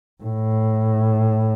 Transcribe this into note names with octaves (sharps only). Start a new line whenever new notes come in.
A2